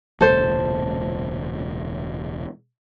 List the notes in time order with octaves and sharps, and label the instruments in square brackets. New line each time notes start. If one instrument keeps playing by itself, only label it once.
[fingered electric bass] E1 C#2 A#2 [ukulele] A4 C5